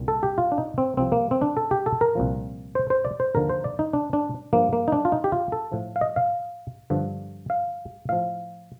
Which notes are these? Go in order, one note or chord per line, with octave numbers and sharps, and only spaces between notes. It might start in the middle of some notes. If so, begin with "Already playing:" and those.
Already playing: C2 A#2
A4
G4
F4
D4
D#4
C4
C2 C3 F3 C4
A#3
C4
D4
A4
G4
A4
A#4
C2 A#2 F3
C5
C5
D5
C5
D#2 D3 F3 A#4
C5
D5
D#4
D4
D4
G2 F3 A#3
A#3
D#4
D4
F4
D#4
G4
F4
A4
A2 F3
F5
D#5
F5
G2 D3 F3
F5
A2 F3 F5